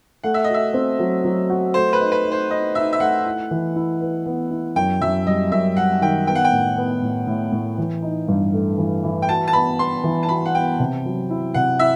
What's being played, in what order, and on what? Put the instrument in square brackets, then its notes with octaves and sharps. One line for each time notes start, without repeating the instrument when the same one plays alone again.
[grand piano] A3 [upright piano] F#5
[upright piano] E5
[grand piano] F#4 [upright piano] D#5
[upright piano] E5
[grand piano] C4
F#3
F#3
F#4
[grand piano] A3 [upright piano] C5
[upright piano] B4
[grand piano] D#4
[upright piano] B4
[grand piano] D#4
[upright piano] C5
[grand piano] D#4 [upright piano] D#5
[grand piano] D#4 [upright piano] E5
[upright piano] E5
[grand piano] A3 [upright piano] F#5
[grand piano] E4
E3
E4
B4
B3
E4
[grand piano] F#2 [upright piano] G5
[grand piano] F#2 [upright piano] E5
[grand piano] G3 [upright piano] D#5
[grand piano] F#2 [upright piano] E5
[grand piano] G3 [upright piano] F#5
[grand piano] D#3 [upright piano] G5
[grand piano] B3 [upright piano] G5
[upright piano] F#5
G5
[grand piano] A2
B3
A2
A2
A2
E3
D#4
G2
A3
E3
E3
[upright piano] G5
[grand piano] F#4 [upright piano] A5
[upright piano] A5
[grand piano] B3 [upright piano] B5
[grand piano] B3 [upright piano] C6
[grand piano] E3
[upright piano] A5
[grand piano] F#4 [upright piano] B5
[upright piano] F#5
[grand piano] B3 [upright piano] G5
[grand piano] C3
F#3
E4
[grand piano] C3 [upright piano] F#5
[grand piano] E4 [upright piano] E5